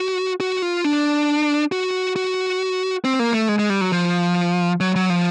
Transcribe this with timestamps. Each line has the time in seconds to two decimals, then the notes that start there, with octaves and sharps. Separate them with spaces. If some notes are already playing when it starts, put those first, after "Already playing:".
Already playing: F#4
0.40 F#4
0.62 F4
0.84 D4
1.72 F#4
2.16 F#4
3.04 C4
3.19 A#3
3.33 A3
3.49 G#3
3.59 G#3
3.70 G3
3.81 F#3
3.92 F3
4.80 F#3
4.96 F#3
5.10 F3